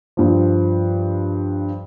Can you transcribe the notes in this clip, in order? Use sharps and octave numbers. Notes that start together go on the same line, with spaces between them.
G2 F3